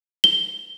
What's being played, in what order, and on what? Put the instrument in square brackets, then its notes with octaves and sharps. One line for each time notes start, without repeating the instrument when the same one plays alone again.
[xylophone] G7